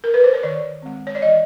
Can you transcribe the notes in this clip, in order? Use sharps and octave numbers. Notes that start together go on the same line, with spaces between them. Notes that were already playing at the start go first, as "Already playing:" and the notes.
A#4
B4
C5
C#5
D#3 D5
G#3 C4
C#5
D5
E3 D#5